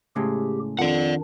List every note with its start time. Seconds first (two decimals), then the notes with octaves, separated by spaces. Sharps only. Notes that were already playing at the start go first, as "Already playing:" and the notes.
0.16 A2 C#3 G#3 G4
0.79 F2 D#3 D4 D5 F#5